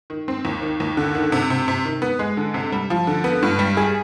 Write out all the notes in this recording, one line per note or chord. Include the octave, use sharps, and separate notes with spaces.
D#3
C4
D#2
D#3
D#2
D3
D#3
C3
C3
C3
D#3
B3
G#3
D3
C3
G3
F3
D3
B3
G2
G3
G#4